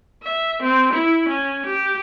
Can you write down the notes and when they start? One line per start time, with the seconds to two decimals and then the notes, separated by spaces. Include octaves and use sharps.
0.23 E5
0.62 C4
0.93 E4
1.29 C#4
1.66 G4